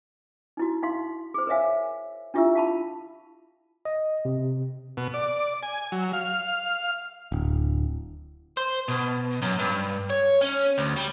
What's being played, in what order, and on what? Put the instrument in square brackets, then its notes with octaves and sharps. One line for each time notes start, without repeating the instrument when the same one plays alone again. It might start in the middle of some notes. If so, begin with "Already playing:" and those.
[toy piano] D#4 E4 F#4
D#4 F5 C6
G#4 C5
A#4 C5 C#5 E5 F5 G#5
D4 E4 F4 G4 E5 E6
F5 A5 B5
[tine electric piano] D#5
C3
[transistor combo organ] B2
D5
G#5
F#3
F5
[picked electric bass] D1
[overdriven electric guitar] C5
B2
F#2
G2
C#5
C#4
D2
G3